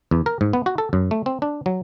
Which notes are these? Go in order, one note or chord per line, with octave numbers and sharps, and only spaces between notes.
E2
A#4
G#2
B3
F#4
A4
F#2
A3
C4
D4
F#3